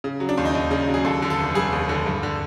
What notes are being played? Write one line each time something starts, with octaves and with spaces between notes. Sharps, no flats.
C#3
F#3
D4
D#2
D#4
D#2 D4
C#3
F#3
G#4
D#2 A4
D3
A4
F1
G3 G#4
D#2
D3
G2
D3